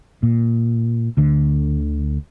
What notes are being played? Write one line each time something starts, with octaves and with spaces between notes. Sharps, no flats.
A#2
D2 D3